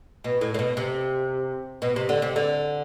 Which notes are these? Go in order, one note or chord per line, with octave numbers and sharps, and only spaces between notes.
B2
A2
A2
B2
C3
B2
C3
D3
C3
D3